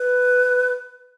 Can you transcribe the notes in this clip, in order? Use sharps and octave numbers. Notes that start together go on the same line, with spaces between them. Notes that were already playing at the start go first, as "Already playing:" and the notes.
Already playing: B4